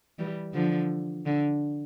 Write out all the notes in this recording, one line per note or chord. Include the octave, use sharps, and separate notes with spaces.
E3 G3
D3 F3
D3